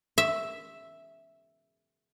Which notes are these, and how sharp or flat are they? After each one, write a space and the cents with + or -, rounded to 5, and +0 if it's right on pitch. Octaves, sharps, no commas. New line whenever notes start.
E5 +0